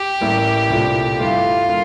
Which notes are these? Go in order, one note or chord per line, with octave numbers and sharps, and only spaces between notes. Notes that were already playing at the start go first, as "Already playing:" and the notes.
Already playing: G4
A1 A2 G3 A#3
C2 A#2 A3 D4
G2 D3 A3 E4 F4
D3 G3 A#3